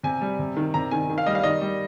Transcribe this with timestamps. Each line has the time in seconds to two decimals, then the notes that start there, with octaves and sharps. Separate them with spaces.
0.03 C3 G#5
0.21 G3
0.39 C3
0.57 D#3
0.74 C3 A#5
0.91 D#3 G#5
1.10 D#3
1.18 F5
1.26 G3 D#5
1.35 F5
1.43 D#3 D#5
1.61 G3